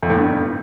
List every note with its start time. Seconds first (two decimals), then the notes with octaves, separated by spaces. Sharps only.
0.02 F2
0.10 A2
0.17 G2